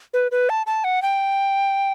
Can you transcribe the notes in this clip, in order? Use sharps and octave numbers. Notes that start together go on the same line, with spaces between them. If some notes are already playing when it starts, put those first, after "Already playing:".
B4
B4
A5
A5
F#5
G5